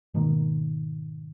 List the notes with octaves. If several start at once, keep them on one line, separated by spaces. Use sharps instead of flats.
G#2 B2 D#3 A#3